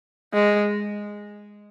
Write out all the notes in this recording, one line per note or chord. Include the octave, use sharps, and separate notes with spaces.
G#3